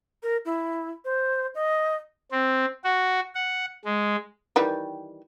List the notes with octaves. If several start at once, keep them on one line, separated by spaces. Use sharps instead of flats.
A#4
E4
C5
D#5
C4
F#4
F#5
G#3
D#3 E3 G3